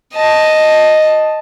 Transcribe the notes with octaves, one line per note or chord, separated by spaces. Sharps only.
D#5 A5